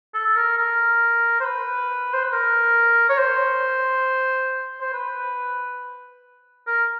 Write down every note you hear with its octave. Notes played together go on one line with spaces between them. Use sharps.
A4
A#4
A#4
C5
B4
C5
B4
A#4
C#5
C5
C5
B4
A#4